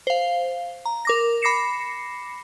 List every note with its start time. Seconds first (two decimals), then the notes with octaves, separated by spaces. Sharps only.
0.07 C5 F5
0.85 A#5
1.05 A#4 D6 A#6
1.42 B5 D6 A#6 C7 C#7 E7